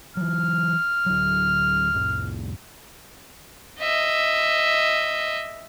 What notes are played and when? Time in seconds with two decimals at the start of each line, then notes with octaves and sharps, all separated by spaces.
0.17 E3 F#3 F6
1.06 D2 F#3
1.94 C2 F2 A2
3.79 D#5 E5